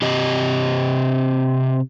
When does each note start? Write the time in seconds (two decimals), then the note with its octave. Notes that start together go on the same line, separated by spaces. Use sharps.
0.02 C3 G4 D#5